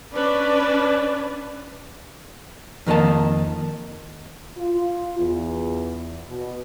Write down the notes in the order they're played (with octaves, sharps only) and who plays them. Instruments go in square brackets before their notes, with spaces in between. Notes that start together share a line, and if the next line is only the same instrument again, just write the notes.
[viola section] C#4 D4 B4 D5
[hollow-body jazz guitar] F2 D#3 A#3 D#5 A5
[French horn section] F4
E2
B2